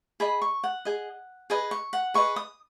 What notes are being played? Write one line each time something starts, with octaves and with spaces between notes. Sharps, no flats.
G#4 D#5 B5
C#6
F#5
G#4 D#5
G#4 B4 D#5 G#5
C#6
F#5
G#4 B4 D#5 C#6
D#6